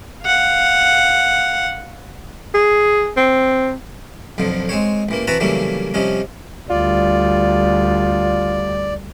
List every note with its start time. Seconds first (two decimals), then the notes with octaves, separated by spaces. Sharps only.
0.24 F5 F#5
2.54 G#4
3.17 C4
4.38 B1 F2 D3 F3
4.69 G#3 C4 C5 C#5
5.09 A1 E3 A#3
5.27 E3 C4 F#4 B4 A5 A#5
5.40 C#3 E3 F#3 G3 A3 A#3
5.94 C3 F3 G3 C#4 D#4
6.70 D2 G3 F4 D5